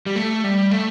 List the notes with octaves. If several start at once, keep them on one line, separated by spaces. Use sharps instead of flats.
G3
A3
G3
A3